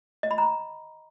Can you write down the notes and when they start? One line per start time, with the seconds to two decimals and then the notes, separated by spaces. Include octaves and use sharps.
0.23 D#5
0.31 B5
0.38 A#5